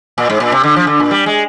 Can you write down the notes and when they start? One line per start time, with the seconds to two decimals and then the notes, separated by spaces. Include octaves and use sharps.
0.18 A#2
0.30 G#2
0.40 A#2
0.52 C3
0.63 D3
0.76 F3
0.87 D3
1.00 A#2
1.11 G3
1.26 G#3